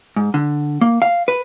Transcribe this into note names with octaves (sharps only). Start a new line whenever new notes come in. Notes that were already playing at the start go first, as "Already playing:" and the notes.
G#2
D3
A#3
F5
B4